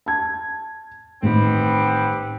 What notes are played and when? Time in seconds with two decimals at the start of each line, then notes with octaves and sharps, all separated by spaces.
0.06 A5 G#6
1.22 A1 D#3 G3 B3 C4